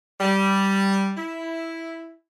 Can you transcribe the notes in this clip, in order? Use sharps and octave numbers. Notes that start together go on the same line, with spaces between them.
G3
E4